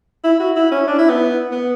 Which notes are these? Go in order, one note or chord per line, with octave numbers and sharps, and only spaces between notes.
E4
F#4
E4
C#4
D4
E4
B3
B3